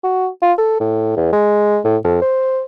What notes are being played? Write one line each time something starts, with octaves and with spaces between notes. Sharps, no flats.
F#4
F4
A4
A2
E2
G#3
A2
F2
C5